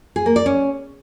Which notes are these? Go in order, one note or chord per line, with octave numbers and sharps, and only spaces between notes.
G#4
A#3
D5
C#4